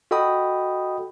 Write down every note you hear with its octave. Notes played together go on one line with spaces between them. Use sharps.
F#4 A4 D#5 G5 B5 D#6